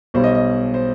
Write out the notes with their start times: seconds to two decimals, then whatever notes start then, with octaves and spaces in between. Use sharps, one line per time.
0.14 B1 B2 G3 C5
0.24 D#5
0.35 D#5
0.74 C5